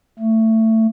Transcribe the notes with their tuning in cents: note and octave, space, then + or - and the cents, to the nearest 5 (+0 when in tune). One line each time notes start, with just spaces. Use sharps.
A3 +20